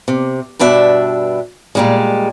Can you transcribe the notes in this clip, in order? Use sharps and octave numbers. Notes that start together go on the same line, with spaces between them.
C3
G2 B2 D4 E5
A#2 G3 G#3